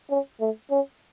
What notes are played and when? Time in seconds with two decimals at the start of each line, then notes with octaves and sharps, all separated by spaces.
0.10 C#4
0.41 A3
0.71 C#4